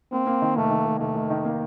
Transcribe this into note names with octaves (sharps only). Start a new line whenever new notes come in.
A#3 C4
A#3
D#3
F1 A3
D#3
F1
F1 A3
F1
D#3
A#3